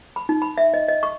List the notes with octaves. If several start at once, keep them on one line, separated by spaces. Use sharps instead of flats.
B5
D#4
B5
E5
D#5
D#5
C#6